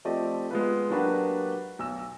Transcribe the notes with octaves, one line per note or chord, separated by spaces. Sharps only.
F3 A3 C4 G4 D5 D#5
G#3 B3 F4 B4
F#3 A#3 D4 F#4 G4 B4
B1 E6